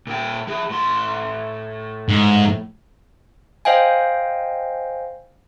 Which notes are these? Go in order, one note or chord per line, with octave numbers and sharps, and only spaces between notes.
A#2 G5
F3 G#4
A2 C6
G#2
C5 D#5 F5 G5 G#5